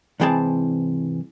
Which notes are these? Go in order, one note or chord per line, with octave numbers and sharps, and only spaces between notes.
C2 G#2 E3 C4 G#4 A5